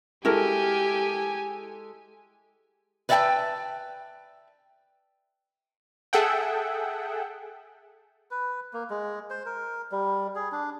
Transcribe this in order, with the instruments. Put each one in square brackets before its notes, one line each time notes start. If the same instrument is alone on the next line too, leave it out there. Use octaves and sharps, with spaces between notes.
[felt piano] G#3 A4 [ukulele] E4 F#4 A#4 [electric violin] G4 G#5
[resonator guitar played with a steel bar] B4 D5 E5 F#5 G5 A5
[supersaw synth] G#4 A4 E5 F#5 G5
[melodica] B4
A#3
G#3
C5
A#4
G3
G#4
D4